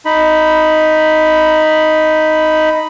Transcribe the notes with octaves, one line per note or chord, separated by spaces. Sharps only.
D#4 B5